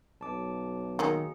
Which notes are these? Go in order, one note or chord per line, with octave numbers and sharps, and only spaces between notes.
B1 A5 D6
D#3 F#3 G#3 A#3 G#4